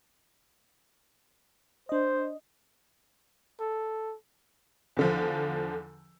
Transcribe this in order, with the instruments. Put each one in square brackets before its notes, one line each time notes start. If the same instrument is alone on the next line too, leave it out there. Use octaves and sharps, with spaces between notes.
[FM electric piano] D4 D#5 [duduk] C5
[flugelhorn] A4
[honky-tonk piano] E2 D3 F3